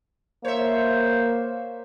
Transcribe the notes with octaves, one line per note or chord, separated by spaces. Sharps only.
A#3 C5 C#5 E5